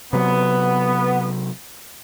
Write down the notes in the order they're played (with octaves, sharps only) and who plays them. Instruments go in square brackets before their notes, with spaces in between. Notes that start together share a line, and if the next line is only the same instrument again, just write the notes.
[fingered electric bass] C3 F#3 [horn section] B3